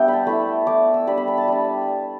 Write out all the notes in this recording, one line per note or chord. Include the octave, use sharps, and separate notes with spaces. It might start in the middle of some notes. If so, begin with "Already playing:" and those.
Already playing: G3 B3 D4 D5 E5 G5
A5 B5
A3 E4 B5
A3 E4 D6
E6
G3 D4 B5
B5
B5
A5
G3 D4